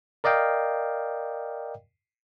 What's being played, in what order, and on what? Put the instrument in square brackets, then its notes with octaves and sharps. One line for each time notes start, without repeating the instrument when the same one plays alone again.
[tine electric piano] A#4 D5 D#5 F5 G5